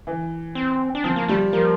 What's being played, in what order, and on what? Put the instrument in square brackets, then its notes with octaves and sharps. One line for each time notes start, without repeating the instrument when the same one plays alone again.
[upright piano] E3
[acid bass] C4
D4
[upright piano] F3 [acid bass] C4
[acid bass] A#3
[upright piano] G3 [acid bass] A3
[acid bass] F3 [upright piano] A#3